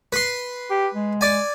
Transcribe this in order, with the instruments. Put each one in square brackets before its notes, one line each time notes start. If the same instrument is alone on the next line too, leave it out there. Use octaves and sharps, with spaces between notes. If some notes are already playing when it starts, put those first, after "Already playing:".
[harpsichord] B4 C6
[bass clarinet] G4
G#3
[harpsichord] D5 G#5